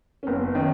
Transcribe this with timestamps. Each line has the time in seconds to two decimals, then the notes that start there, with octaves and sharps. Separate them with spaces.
0.23 C#4
0.27 F#1 B3
0.55 D#3 C#4